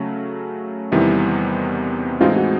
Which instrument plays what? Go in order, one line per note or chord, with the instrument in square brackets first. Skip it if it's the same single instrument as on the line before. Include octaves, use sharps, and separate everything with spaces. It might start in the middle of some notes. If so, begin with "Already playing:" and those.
Already playing: [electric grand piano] C#3 F#3 A3 C#4
[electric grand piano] E2 C3 D#3 G3 B3 [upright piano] E4
[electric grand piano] A2 E3 G#3 C4 D#4 [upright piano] F4
[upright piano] F#4